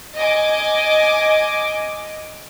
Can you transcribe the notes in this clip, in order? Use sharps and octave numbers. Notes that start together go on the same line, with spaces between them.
D#5 G#5 D6